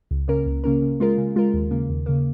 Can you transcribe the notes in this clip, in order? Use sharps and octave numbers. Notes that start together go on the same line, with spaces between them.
C#2
C#3 A#3 C#4 A#4
C#2
C#3 A#3 C#4 A#4
C#3
G#3 F4 A#4
C#3
G#3 F4 A#4
D#2
C#3 A#3
D#2
C#3 A#3